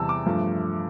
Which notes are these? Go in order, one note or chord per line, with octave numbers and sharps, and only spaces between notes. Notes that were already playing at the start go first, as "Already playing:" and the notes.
Already playing: E2 C3 E3 G3 A5 E6
D6
G2 F3 A3